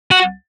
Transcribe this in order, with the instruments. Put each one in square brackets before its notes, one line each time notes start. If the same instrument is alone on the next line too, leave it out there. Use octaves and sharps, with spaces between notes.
[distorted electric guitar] F#4